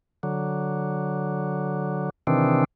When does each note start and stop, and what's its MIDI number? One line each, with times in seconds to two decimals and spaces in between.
0.23 2.10 50
0.23 2.10 54
2.27 2.64 48
2.27 2.64 51
2.27 2.64 52
2.27 2.64 60
2.27 2.64 62